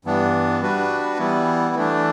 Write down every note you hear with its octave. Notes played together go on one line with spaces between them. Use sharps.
G2 E3 B3 D4
G3 D4 F#4 B4
E3 G3 B3 E4
E3 A3 D4